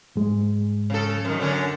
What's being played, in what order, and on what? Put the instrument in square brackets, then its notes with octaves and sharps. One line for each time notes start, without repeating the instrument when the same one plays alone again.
[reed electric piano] G#2 G#3
[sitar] C#3 A4
F#2 D#3
F#2 D3 C#4